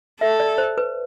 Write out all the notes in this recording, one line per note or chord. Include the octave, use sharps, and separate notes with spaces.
A4 E5
D5
C5
B4